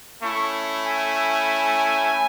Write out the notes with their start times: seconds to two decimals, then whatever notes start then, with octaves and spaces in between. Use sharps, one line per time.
0.22 A3 C#4 E4 C#6
0.87 G#5